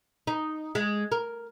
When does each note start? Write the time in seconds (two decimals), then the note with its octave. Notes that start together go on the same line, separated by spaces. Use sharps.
0.27 D#4
0.75 G#3
1.12 A#4